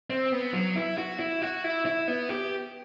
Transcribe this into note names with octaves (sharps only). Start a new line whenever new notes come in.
C4
B3
F#3
E4
F#4
E4
F#4
E4
E4
B3
G4